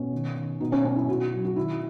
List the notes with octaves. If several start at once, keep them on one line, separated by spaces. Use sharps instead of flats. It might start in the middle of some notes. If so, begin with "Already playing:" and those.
Already playing: B2 C#4
D#3
D#3
B2 D#4
C#4
B2 C#4
E4
B2 F#4
F#3
F#4
D#3 E4